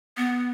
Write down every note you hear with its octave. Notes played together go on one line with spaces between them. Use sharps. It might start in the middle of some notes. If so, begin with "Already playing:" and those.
B3